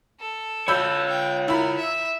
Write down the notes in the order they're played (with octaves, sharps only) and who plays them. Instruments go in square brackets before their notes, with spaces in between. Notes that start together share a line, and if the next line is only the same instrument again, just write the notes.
[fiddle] A4
[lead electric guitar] F4 C#5 [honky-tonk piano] B5 E6 G6
[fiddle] G5
[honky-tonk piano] E4 B5 [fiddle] A#4
[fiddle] E5